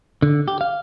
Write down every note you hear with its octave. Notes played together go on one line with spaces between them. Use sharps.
D3
G4
F5